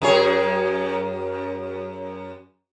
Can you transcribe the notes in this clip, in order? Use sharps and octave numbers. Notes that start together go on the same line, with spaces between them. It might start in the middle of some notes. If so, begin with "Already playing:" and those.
F#2 G#4 C#5